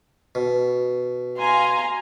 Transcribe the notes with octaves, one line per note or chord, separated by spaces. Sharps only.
B2
F5 G#5 A#5 C6